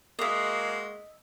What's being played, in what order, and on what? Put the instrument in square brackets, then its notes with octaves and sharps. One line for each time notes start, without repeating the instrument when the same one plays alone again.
[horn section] G#3 A#3 F#4 [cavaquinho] D#5 E5